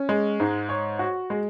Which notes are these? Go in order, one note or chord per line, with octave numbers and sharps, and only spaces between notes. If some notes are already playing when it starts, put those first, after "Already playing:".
Already playing: C#4
G#3
G#2
C#5
F#4
G#3